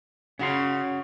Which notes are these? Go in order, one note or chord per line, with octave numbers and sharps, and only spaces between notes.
C#3 C#4 F#4 C6